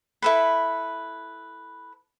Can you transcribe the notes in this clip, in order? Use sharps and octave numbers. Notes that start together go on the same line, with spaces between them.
E4 A4 B4